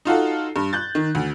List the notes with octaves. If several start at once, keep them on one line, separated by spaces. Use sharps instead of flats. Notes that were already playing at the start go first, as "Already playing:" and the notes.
D#4 F4 F#4 A4
G2
F#6 G6 A6
D#3
D2